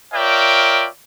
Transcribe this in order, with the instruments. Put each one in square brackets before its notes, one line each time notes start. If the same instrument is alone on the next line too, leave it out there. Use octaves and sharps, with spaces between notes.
[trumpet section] F4 A#4 C#5 D5 E5 G5